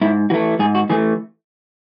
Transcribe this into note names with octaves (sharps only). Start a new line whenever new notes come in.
G#2 E4
E3 A3 F#4
G#2 G#4
F#4
E3 A3 G#4